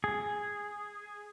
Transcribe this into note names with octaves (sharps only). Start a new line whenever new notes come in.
G#4